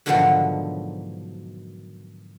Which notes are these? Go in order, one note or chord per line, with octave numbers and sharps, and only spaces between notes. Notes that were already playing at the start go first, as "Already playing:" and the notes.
G#2 B2 D3 D#3 F3 F#3